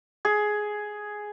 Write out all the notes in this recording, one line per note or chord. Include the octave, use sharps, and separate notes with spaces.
G#4